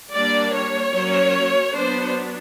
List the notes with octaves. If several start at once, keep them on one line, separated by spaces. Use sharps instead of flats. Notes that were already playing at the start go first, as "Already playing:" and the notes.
G3 A#3 D4 D5
C#5
F#3 A#3 C#4
F#3 B3 D4 C5